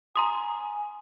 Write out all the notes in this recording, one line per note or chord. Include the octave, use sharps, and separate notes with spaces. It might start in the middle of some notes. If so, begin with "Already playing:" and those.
G#5 A#5 C6 D#6